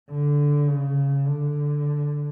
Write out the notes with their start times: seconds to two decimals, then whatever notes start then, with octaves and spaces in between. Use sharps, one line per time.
0.10 D3
0.68 C#3
1.25 D3